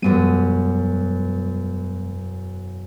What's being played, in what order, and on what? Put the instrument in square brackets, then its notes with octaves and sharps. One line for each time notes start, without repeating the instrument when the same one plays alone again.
[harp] E1 F#2 D#7 [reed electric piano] G3 G#3 B3